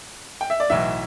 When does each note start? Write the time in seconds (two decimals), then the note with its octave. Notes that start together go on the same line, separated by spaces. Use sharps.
0.41 G5
0.50 E5
0.60 D5
0.70 B1 A2 E3 E5